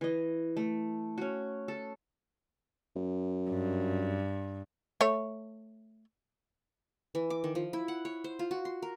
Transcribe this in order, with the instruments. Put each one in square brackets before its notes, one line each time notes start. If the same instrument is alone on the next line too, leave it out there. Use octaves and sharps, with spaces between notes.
[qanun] E3 D#5
A3
C#4 F#4
A4
[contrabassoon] F#2
[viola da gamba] G2
[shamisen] A3 C#5
[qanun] E3
D6
D#3
F3
E4
F#5
C#5
C5
F4
F#4
C6
A#4